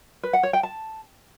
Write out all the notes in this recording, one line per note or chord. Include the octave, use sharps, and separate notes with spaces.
B4
F#5
C#5
G5
A5